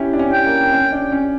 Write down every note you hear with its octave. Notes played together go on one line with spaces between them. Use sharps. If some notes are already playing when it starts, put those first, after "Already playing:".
Already playing: C#4 E4 G4
D4
C#4
G5
A#3
C#4
D4
C#4